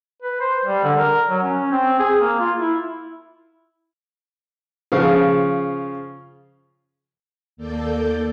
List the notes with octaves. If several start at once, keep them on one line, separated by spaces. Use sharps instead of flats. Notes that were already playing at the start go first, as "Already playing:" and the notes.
B4
C5
G3
D3
A#4
F#3
C#4
C4
G#4
A#3
F4
E4
C#3 F3 F5
D#2 A#3 A4 D5 G6